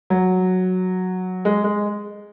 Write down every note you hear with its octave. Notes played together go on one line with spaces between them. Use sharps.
F#3
G#3
G#3